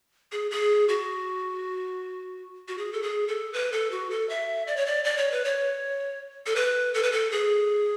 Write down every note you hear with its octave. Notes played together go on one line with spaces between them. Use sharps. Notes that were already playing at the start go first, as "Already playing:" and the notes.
G#4
G#4
F#4
F#4
G#4
A4
G#4
A4
B4
A4
F#4
A4
E5
D5
C#5
D5
D5
C#5
B4
C#5
A4
B4
A4
B4
A4
G#4